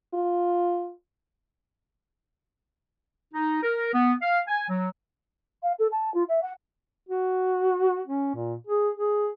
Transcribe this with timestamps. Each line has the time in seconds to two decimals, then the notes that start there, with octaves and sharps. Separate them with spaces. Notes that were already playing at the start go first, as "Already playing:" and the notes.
0.14 F4
3.34 D#4
3.63 A#4
3.94 B3
4.22 F5
4.48 G#5
4.69 F#3
5.63 F5
5.79 A4
5.91 A5
6.14 F4
6.28 E5
6.42 F#5
7.09 F#4
8.08 C#4
8.35 A#2
8.67 G#4
8.96 G#4